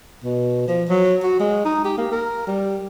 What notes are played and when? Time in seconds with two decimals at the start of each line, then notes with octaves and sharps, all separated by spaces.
0.24 B2
0.68 F3
0.89 F#3
1.23 F#4
1.40 G#3
1.65 D#4
1.84 G4
1.97 A#3
2.11 A#4
2.47 G3